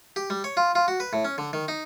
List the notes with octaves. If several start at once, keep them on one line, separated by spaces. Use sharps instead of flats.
G4
G3
C#5
F4
F4
F#4
B4
A2
C#4
D3
D#3
D#4